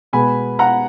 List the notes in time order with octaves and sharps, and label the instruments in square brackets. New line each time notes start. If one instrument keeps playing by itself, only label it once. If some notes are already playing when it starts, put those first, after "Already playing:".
[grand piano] B2 G#3 B3 G#5 B5
F#5 A#5